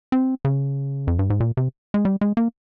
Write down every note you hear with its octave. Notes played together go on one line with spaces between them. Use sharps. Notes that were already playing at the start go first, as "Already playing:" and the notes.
C4
C#3
F2
G2
G#2
A#2
C3
G#3
G3
G#3
A#3